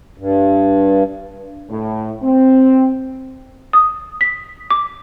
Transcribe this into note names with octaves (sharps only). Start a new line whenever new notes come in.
G2
A2
C4
D#6
B6
D6